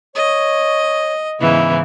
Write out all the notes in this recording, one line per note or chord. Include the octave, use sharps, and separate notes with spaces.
C#5 D#5
G#2 C#3 E3 B3 E4